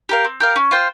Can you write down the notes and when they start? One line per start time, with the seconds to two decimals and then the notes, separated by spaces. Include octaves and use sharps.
0.09 G4 A#4 F5
0.24 C4
0.40 G4 A#4 F5
0.56 C#4
0.71 F4 C5 G5